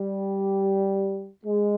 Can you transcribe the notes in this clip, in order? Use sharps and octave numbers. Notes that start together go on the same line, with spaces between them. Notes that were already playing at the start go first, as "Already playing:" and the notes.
Already playing: G3
G#3